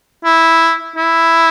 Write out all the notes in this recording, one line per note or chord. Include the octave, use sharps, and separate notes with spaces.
E4
E4